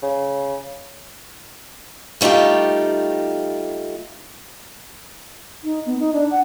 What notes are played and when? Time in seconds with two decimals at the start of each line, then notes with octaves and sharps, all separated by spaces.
0.03 C#3
2.21 G3 A3 D#4 F4 G4
5.64 D#4
5.86 B3
5.99 D#4
6.13 D4
6.31 F#5